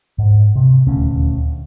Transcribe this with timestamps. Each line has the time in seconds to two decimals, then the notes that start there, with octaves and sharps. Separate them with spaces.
0.18 G#2
0.56 C3
0.87 D#1 D2 C#4